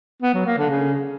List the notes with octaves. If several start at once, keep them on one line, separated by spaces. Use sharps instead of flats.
B3
F#3
A#3
D3
C#3